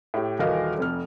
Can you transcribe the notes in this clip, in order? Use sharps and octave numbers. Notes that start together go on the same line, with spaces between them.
A2 G4
D#1 E3 F#4 A#4 D#5 F5
F1 F2 F6